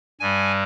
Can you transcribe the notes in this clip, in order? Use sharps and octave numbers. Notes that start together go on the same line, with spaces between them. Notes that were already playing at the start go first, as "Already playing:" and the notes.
G2 G3 G#5